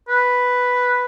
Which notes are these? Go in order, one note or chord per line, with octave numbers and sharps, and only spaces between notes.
B4